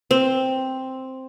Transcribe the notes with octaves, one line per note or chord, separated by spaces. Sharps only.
C4